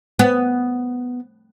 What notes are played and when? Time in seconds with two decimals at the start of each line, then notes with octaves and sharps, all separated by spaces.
0.19 B3